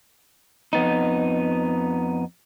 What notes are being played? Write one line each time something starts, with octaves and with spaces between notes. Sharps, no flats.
F2 B3 D#4